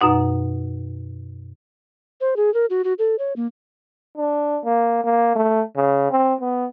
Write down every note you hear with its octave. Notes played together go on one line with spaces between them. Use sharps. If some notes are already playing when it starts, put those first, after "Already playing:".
F#2 B2 D#4 F#5
C5
G#4
A#4
F#4
F#4
A4
C#5
A#3
D4
A#3
A#3
A3
C#3
C4
B3